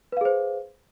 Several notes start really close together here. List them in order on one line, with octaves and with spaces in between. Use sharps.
B4 F5 G#4 C5